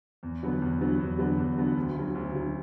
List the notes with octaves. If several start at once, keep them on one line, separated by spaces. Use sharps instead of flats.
E2
D3 F#3 B3
E2
D3 F#3 B3
E2
D3 F#3 B3
E2
D3 F#3 B3
D2
C#3 F#3
D2
C#3 F#3